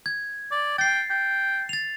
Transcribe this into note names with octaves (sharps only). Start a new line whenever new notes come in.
G#6
D5
G5 A6 C7
G5
A6 F7